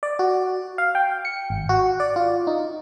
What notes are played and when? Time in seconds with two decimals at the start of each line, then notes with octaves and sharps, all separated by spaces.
0.03 D5
0.19 F#4
0.78 F5
0.95 G5
1.25 C#7
1.50 G#1
1.69 F#4
2.00 D5
2.16 F4
2.47 D#4